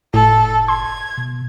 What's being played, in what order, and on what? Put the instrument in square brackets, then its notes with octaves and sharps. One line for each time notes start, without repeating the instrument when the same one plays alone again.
[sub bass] F#1 [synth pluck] A2 [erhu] A4
[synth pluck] C6 [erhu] G#6
[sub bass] B2